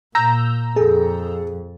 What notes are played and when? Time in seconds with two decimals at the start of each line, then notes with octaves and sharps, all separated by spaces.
0.15 A#2 A#5 E6 G6
0.76 F2 G#4 A4